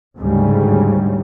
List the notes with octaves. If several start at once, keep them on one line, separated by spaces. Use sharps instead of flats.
D2 G#2 C#3 G3